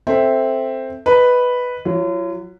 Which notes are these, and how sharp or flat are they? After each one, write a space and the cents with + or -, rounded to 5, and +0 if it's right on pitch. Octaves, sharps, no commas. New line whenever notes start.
C4 +0 A4 +0 E5 +0
B4 +0 D#5 +0
F#3 +0 F4 -45